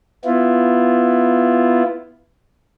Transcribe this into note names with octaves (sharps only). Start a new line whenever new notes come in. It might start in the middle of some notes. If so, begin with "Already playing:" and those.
B3 E4 F4